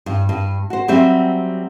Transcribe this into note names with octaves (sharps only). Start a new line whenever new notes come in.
G2
G2
F#4 C5
F#3 G3 C4 G4 C5 E5